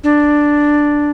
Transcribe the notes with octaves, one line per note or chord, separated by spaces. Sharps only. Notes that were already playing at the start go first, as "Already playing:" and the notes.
D4